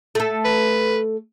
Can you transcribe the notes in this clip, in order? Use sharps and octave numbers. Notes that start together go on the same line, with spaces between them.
A3 A4
B4